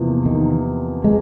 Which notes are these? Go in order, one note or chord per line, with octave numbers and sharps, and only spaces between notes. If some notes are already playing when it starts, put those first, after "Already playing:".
Already playing: E2 C3 F3 A#3
D#3
G#3